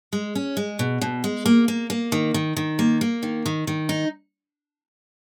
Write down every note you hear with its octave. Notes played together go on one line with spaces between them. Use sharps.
G#3
C#4
G#3
B2
B2
G#3
A#3
A#3
A#3
D#3
D#3
D#3
A#3
A#3
D#3
D#3
D#3
D#4